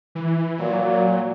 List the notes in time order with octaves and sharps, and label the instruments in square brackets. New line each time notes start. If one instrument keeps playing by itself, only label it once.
[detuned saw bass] E3
[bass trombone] A#2 [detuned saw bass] F#3